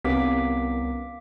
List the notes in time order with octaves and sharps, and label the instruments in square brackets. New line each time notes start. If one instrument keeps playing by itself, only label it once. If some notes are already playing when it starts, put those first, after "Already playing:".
[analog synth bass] C2 [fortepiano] C3 [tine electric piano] B3 C#4 A#4 [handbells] F5 D6 B6